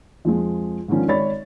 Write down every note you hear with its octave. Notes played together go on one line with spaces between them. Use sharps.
F2 F3 G#3
G#2 D3 D#3 F3 C#4
G#1 C#5 D5 B5 A6